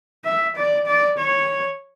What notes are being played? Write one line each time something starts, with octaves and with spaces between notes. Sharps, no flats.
E5
D5
D5
C#5